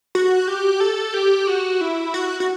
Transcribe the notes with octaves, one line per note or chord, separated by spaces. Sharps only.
F#4
G4
A4
G4
F#4
E4
F#4
F#4